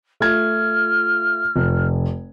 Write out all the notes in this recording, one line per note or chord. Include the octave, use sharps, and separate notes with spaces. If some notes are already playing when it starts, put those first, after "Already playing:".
A3 F4 F6 G#6
F1